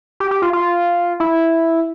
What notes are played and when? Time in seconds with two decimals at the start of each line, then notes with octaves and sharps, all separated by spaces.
0.20 G4
0.31 G4
0.42 F4
0.53 F4
1.20 E4